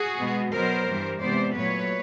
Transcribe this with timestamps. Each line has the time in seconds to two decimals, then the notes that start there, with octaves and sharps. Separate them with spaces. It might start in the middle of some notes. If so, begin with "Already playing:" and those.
Already playing: F#4 G#4
0.18 B2 G#3 B3
0.52 B2 F#3 B3 A#4 C5
0.87 G2 E3 G3
1.21 C3 E3 G#3 B3 C5 D5
1.55 A#2 F#3 A3 B4 C#5